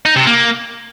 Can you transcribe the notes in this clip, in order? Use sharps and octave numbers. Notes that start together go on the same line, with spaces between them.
D#4
C3
A#3